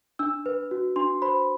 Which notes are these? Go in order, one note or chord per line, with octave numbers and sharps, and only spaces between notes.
D4 E6
B4
F#4
D4 C6
C5 B5